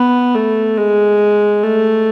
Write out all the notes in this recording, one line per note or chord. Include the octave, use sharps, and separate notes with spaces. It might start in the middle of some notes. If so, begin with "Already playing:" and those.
Already playing: B3
A3
G#3
A3